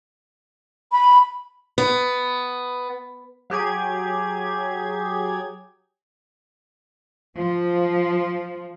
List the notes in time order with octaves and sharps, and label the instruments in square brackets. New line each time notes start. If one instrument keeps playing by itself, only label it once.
[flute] B5
[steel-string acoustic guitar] B3
[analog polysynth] F#3 G4 G#4 G#6
[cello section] F3